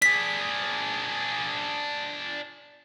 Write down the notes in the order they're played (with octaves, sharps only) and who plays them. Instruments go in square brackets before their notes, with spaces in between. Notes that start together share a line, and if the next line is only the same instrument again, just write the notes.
[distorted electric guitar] D4 G#4 [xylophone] B6